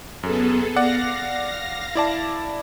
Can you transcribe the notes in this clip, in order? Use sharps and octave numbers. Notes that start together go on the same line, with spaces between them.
F#2 B3 G#4 A4
D5 F5 F#5 A#6
E4 D5 A5